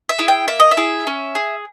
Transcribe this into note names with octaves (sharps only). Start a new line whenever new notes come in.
E5
E4 G#4
G5
A#3 E5
D#5
E5
E4 G#4
C#4
G#4